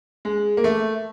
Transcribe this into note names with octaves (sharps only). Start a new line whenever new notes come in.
G#3
A#3
A3